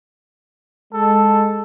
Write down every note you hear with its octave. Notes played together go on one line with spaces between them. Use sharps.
G#3 A4